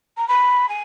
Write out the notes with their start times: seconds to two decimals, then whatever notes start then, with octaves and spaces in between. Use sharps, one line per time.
0.17 A#5
0.28 B5
0.69 G#5